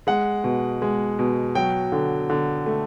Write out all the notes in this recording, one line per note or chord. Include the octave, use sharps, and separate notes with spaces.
G#3 F#5
B2
G#3
B2
F#3 G5
D3
D3
A3